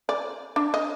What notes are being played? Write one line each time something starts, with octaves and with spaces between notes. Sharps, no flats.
D5
D4
D#5